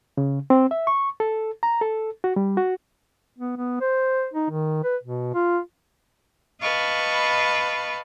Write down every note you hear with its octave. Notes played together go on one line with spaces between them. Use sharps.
C#3
C4
E5
C#6
A4
A#5
A4
F#4
G3
F#4
B3
B3
C5
D#4
D#3
B4
B2
F4
B4 D#5 F5 A5 B5 C#6